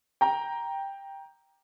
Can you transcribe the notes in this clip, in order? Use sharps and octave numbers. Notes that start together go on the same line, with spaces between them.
G5 A#5